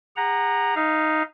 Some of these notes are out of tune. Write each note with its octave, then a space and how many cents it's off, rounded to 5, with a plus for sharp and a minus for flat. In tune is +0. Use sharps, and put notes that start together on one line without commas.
G#4 -45 F#5 +0 A#5 +0
D#4 +0 F5 -15